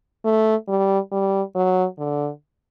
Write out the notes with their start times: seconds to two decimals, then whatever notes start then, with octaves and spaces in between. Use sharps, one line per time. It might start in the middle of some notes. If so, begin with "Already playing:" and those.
0.25 A3
0.68 G3
1.12 G3
1.55 F#3
1.99 D3